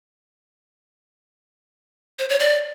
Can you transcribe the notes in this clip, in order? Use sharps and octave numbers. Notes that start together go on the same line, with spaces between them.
C5
C#5
D5